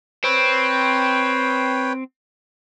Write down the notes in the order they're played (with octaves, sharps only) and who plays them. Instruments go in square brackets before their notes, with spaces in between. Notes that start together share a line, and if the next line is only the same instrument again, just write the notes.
[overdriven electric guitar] C4 [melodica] B4 C#5 G5